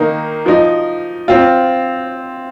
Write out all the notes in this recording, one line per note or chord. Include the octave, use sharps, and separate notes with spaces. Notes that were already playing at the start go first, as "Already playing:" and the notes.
Already playing: D#3 A#3 D#4
F3 D#4
C4 F4